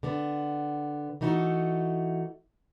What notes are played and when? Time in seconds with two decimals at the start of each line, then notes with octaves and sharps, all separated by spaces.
0.03 D3 B3
1.21 E3 A3 D#4 F#4